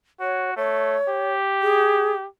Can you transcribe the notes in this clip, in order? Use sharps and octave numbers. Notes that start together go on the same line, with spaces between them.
F#4 C#5
A3 C#5
G4
G#4